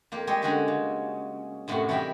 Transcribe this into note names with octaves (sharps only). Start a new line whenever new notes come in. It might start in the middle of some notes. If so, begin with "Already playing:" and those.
F2 A#3 G4
G3 G#3 G4 C#5 D#5
D3 G#3 C#4 F#4 G#4 C#5
C#3
F#2 A2 C3 F#3 F#4 F#5
E3 G3 D#4 A#4 E5 G5